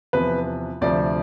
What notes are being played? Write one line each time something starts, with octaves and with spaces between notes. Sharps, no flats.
E2 C3 F3 B4
D2 C3 F3 D5